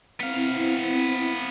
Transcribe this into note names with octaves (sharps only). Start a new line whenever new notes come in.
B3 C4 E4 F5